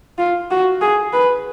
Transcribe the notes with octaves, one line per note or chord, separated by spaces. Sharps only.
F4
F#4
G#4
B4